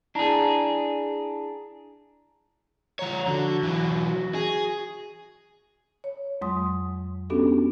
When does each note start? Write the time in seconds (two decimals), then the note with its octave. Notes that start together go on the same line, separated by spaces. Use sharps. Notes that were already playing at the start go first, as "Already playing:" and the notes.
0.15 D4 E4 G#4 A5 A#5
2.99 F3 C#5 A#5
3.27 D3 F#4
3.63 E3 F#3
4.05 F#4
4.35 G#4
6.04 C#5
6.41 F2 F#3 G#3 C6 D#6
7.30 B3 C#4 D4 F#4 G4 A4